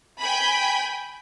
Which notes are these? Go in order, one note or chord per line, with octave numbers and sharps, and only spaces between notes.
G5 G#5 B5